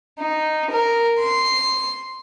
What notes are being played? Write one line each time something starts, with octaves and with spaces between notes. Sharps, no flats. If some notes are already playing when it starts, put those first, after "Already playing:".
D#4
A#4
C6